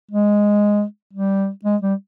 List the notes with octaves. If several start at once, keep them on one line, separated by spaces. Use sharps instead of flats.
G#3
G3
G#3
G3